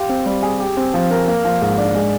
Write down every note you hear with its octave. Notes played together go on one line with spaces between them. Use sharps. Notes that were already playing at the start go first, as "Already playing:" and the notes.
Already playing: F4 G4
C4
G3
G#4
G4
C4
F3
A#4
A#3
F3
G#2
D4
G#3